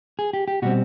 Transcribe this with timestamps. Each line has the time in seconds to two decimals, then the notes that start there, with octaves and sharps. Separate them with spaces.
0.19 G#4
0.33 G4
0.48 G4
0.62 B2 G3 C4 F#4